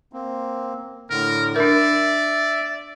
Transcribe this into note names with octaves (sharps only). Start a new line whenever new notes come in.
A#3 C4
A2 D3 A#4
D4 A#4 D5 E5